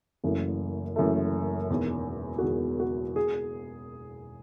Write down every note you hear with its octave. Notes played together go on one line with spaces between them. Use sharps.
F#1 F#2 E3 A3
F#1 F#2 E3 A3
E1 E2 D#3
F#4
E1 E2 D#3 G#4
F#4
G#4